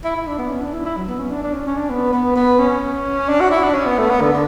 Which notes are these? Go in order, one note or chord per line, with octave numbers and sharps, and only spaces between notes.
E4
E4
D4
B3
C#4
D4
E4
E4
F#3
B3
C#4
D4
D4
C#4
C#4
D4
B3
B3
B3
C#4
D4
F#4
E4
D4
C#4
B3
A3
B3
D3
D3